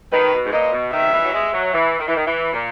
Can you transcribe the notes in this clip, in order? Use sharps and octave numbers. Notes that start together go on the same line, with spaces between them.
D#3 B4
B2
G#2
A#2 D#5
B2
D#3 E5
E3
F#3
G#3
F#3
E3
D#3
E3
D#3
E3
A#2